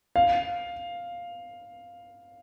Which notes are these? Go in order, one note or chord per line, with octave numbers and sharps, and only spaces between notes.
F5